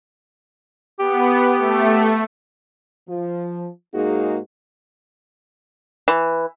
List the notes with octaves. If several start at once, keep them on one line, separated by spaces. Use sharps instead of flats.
B3 G4
A3
F3
G#2 G#3 A#3 D#4 F#4 G#4
E3